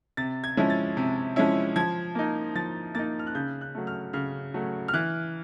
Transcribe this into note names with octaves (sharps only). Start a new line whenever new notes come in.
C3 A6
G#6
F3 G#3 C#4 E4
A6
C3
F3 G#3 C#4 E4
F3 G#6
A#3 D#4
F3 A6
A#3 D#4 A6
F6
F#6
C#3 G6
F#6
F#3 A3
F6
C#3 F6
F#3 A3
F6
E3 F#6